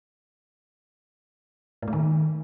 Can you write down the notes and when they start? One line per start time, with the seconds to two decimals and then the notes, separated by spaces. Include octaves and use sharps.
1.82 A2
1.88 A3
1.93 D#3